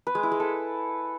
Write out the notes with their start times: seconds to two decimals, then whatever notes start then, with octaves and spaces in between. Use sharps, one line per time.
0.07 B4
0.15 G#3
0.23 E4
0.31 G#3
0.40 A4